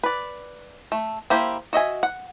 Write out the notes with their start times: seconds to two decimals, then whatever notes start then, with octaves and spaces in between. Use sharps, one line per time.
0.03 B4 D5
0.92 A3
1.30 A#3 E4 G4 C5
1.73 F#4 D#5 E5 G#5
2.03 F#5